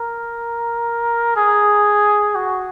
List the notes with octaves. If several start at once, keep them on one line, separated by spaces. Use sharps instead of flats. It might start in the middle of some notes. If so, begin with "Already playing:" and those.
Already playing: A#4
G#4
F#4